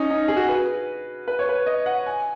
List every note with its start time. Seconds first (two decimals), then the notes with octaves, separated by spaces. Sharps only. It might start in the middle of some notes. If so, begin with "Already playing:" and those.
Already playing: C#4 D#4
0.10 D#4
0.28 G#4
0.37 F#4
0.49 B4
1.28 B4
1.39 C#5
1.49 B4
1.66 D#5
1.86 F#5
2.06 G#5